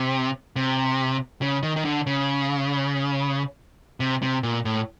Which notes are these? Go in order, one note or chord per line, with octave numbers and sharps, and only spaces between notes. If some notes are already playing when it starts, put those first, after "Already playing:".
Already playing: C3
C3
C#3
D#3
D#3
D3
C#3
C3
C3
A#2
A2